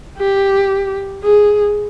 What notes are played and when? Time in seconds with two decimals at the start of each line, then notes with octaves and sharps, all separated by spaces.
0.18 G4
1.23 G#4